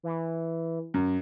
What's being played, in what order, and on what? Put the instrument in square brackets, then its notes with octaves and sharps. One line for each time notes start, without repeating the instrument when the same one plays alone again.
[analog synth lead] E3
[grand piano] F#2